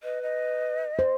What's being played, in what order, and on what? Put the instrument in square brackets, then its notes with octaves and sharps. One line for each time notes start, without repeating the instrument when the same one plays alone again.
[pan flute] B4 [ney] D#5
[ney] D#5
[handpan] C5